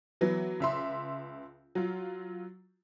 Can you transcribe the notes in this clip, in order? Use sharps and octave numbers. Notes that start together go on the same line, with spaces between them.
E3 F#3 B3
C#2 E5 C6
F#3 F4